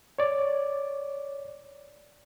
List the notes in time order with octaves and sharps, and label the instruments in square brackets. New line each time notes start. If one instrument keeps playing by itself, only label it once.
[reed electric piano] C#5 D5